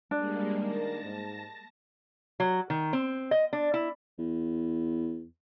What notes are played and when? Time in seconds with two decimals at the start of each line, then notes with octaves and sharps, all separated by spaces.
0.11 G3 G#3 A#3 D4
0.62 D#3 A#3 A#4 A5 A#6
1.03 G#2
2.40 F#3
2.70 D#3
2.93 C4
3.31 D#5
3.53 D4
3.74 E4
4.19 E2